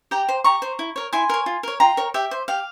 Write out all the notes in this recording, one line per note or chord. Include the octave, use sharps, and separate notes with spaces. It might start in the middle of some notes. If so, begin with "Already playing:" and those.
G4 G5 A#5
C5
G4 A#5 C#6
C5
E4
A#4 C#5
E4 G#5 C6
A#4 C#5
F4
A#4 C#5
F4 G5 A#5
A#4 C#5
G4 E5
C5
G4 F5